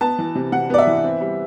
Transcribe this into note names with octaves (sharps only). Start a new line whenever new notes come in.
B3 A5
E3
C3
C3 F#5
B3 D5
E5
E3
C4
G3